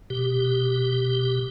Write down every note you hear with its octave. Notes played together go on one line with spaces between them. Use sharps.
B2 G4